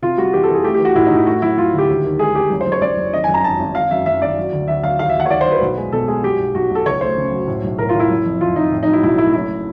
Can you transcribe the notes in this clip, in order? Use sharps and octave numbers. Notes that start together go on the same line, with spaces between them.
C3 F4
G3 F#4
E3 G4
A4
E3
G#4
A3 G4
G4
E3
F#4
A2 E4
D#4
A2
E4
A3 F#4
F#3 E4
F#3 F4
D2
G4
D#2
D#3
G#3 G#4
G#3 G4
F#1
C5
F#1
C#5
F#1 D5
F#1
G#1 D#5
G#5
F#2
A#5
G#1 A5
G#1
G#1 F5
F#2 E5
F#2 E5
G#1 D5
F#3
D2
D2 E5
F#3 F5
D#2 F5
E5
D#2 F#5
C#5
D#2 D5
C5
F#3
B4
B1
G#3
B2 A4
G#3 G#4
F#3 G4
B1
B1 F#4
B1
A4
C#2 C#5
A3 C5
C#3
F#3
A2
B1
A2 A#4
F4
A2
E4
F#1
F2
F2 F4
F2 D#4
A2
D#4
F#3
E4
B1 E4
A3 E4
F#1 E4